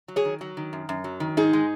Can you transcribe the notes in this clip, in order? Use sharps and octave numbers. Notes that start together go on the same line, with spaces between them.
F#3
G#4 C#5
D#3
F#3
D#3
F#2
F#2
F#3
D#3
G#2 D#4 G#4
G#3